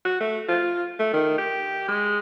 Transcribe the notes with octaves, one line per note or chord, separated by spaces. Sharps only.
F#4
A3
F4
A3
D#3
G4
G#3